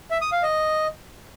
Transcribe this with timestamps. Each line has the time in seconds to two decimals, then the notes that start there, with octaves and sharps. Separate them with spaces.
0.11 E5
0.21 D#6
0.32 F5
0.43 D#5